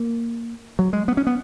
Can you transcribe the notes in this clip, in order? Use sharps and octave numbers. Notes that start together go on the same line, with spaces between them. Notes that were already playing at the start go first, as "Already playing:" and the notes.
Already playing: A#3
F#3
G#3
B3
C#4
B3